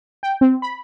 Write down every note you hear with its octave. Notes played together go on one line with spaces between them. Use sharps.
G5
C4
B5